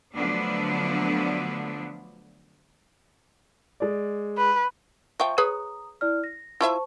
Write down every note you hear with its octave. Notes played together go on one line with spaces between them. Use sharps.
D3 F3 F#3 A3 B3 D4
G#3 D5
B4
F3 E5 G5 C#6
G#4 B4 C#5 A#5 D#6
E4 D5 F6
A#6
E4 F4 C5 E5 A5 C#6